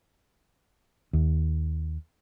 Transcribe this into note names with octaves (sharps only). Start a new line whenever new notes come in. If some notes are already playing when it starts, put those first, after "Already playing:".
D#2